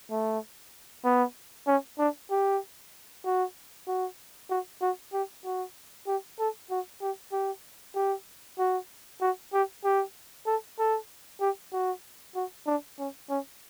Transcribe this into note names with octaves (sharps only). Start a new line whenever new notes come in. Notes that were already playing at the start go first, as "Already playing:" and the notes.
A3
B3
C#4
D4
G4
F#4
F#4
F#4
F#4
G4
F#4
G4
A4
F#4
G4
G4
G4
F#4
F#4
G4
G4
A4
A4
G4
F#4
F#4
D4
C#4
C#4